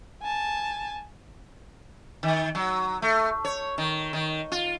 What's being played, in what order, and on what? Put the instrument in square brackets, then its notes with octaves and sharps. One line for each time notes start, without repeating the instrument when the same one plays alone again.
[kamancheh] G#5 A5
[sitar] D#3
F#3
A3
C#5
D#3
D#3
F4